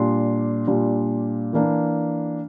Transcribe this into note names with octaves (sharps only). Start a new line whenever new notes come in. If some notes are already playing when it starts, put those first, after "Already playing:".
Already playing: A#2 G3 D4 C6
A#2 G3 D4
E3 A#3 D4